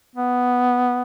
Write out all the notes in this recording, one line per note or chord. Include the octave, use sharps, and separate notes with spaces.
B3